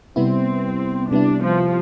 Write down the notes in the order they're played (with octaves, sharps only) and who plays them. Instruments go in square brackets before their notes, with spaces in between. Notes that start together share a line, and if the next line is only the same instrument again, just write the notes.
[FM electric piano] C3 G3 B3 E4 [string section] C4
[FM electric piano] C3 G3 B3 E4 [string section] D4
[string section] F3